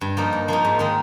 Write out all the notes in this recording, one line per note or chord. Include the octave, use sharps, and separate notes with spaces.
G2
F3 A#3 D#4
G2
F3 A#3 D#4
G#2
D#3 G#3 D#4